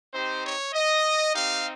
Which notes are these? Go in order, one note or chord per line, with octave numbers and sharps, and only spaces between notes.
C4 D#4 G4 C5
C#5
D#5
C4 D#4 G4 F5